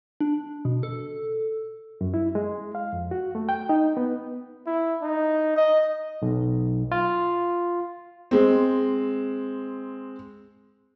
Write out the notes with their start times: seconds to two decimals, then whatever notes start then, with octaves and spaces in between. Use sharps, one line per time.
0.21 D4
0.65 B2
0.83 A4
2.01 F#2
2.14 E4
2.35 G#3
2.75 F5
2.93 F2
3.11 F#4
3.35 A3
3.49 G5
3.69 D#4
3.97 B3
4.66 E4
5.02 D#4
5.57 D#5
6.22 B1
6.91 F4
8.31 G#3 C4